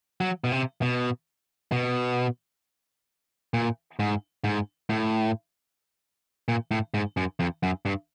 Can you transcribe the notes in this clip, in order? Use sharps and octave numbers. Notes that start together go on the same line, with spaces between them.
F#3
B2
C3
B2
B2
A#2
G#2
G#2
A2
A#2
A2
G#2
F#2
F2
F#2
G2